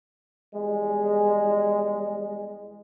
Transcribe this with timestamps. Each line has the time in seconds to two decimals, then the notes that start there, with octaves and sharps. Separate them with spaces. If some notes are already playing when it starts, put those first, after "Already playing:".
0.54 E2 G3 G#3